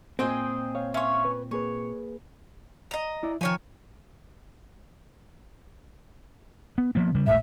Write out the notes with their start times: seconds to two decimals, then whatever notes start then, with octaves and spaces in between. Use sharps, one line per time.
0.19 A#2 C4 G#4 D#5 G5
0.75 C#5 F5
0.94 C#4 C#5 E5 F5 C6
1.25 B4
1.51 A#3 G#4 B4 C#5
2.91 D#5 A#5
3.23 E4 D5
3.41 D#3 F3 C#5 G#5
6.78 B3
6.95 F3 A#3 B3
7.15 C#3 G3
7.27 D#1 G#1 A2 E5